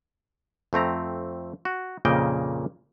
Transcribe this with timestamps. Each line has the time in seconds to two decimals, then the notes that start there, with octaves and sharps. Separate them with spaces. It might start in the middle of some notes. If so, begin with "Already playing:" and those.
0.73 F2 A3 C4 A#5
1.65 F#4
2.05 F2 A#2 C#3 A#3 D#5 G5